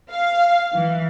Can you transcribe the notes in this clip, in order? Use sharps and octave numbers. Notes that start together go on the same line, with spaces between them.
F5
E3